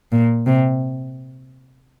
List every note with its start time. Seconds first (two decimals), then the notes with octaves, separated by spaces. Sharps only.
0.12 A#2
0.47 C3